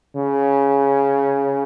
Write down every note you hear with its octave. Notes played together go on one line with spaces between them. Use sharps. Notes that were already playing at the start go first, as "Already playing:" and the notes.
C#3